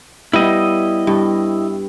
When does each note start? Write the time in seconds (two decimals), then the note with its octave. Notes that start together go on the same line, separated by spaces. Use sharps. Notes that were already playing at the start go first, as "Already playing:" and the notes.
0.33 G3 B3 E4 D#5
1.07 G2